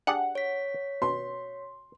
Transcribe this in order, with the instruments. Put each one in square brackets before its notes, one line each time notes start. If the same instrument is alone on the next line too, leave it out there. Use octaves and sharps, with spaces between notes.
[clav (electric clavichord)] D4 G4 G#4 [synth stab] F#5
[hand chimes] C#5 B6
[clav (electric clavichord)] B2 [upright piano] C6